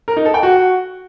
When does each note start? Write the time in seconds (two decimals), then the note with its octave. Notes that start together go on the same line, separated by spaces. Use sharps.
0.08 A#4
0.17 D#4
0.25 A4
0.34 G5
0.43 F#4